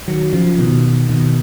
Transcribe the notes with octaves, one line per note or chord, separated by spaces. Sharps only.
D#3 F#3
C#3 F3
B2 D#3
B2 D#3